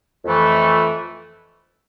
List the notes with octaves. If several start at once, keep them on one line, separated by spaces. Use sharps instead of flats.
F2 E3 A3